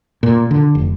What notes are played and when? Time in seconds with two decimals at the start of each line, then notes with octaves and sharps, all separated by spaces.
0.23 A#2
0.51 D3
0.75 F1